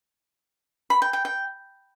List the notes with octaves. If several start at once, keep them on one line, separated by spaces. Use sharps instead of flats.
B5
G5
G5
G5